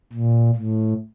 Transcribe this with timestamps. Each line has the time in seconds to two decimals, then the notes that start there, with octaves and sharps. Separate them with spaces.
0.13 A#2
0.55 A2